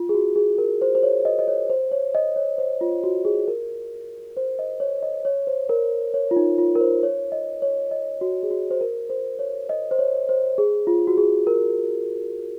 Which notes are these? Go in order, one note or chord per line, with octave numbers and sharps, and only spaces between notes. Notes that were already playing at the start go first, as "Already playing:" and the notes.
Already playing: F4
G#4
F#4
G#4
A#4
C5
C5
C#5
D#5
D#5
C#5
C5
C#5
D#5
C#5
C5
F4
F#4
G#4
A#4
C5
D#5
C#5
D#5
C#5
C5
A#4
C#5
F4
D#4
F4
A#4
C5
C#5
D#5
C#5
D#5
F#4
G#4
F#4
C5
A#4
C5
C#5
D#5
C5
C#5
C5
G#4
F4
F#4
G#4
A#4